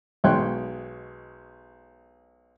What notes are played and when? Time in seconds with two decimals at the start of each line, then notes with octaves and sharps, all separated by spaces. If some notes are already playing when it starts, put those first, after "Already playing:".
0.24 B1 G#3 C#5 G5 C6 F#6